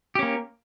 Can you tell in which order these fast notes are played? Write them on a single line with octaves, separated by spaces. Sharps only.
G4 C#4 A#3